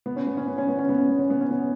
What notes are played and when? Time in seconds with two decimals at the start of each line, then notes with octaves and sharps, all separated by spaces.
0.06 B3
0.16 C#4
0.27 B3
0.37 C#4
0.47 B3
0.58 C#4
0.69 B3
0.79 C#4
0.89 B3
0.99 C#4
1.09 B3
1.19 C#4
1.30 B3
1.41 C#4
1.51 B3